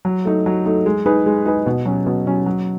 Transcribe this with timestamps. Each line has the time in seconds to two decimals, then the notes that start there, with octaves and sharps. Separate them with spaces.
0.05 F#3
0.25 A3 D#4
0.46 F#3
0.66 A3 D#4
0.86 G#3
1.06 D#4 G#4 B4
1.26 G#3
1.46 D#4 G#4 B4
1.66 B2
1.86 F#3 C#4
2.07 B2
2.27 F#3 C#4
2.46 F#3